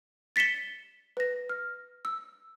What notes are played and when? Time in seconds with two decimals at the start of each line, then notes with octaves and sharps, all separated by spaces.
0.36 A6 B6 C#7 E7 G7
1.17 B4 A#6
1.49 F6
2.05 E6